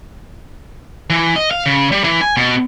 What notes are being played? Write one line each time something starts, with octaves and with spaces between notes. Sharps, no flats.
E3
D#5
F5
C#3
G3
E3
G#5
B2